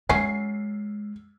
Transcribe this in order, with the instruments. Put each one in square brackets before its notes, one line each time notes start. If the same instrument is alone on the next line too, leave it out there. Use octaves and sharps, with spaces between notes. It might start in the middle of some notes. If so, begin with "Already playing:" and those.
[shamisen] F#3 C#4 [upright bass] G#3 [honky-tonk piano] C7